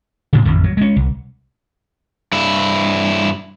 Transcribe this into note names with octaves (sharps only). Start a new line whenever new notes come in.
A2 C#3
A1 F2 D#3
F#3
G#3 C#4
C2
G2 E4